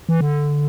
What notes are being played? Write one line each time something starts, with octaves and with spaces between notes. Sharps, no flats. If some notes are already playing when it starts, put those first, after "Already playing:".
E3
D3